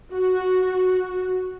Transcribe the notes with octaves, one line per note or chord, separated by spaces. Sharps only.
F#4